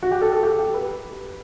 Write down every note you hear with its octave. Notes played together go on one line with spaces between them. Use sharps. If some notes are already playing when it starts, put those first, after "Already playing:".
F#4
G4
A4
A4
G4
G4
B4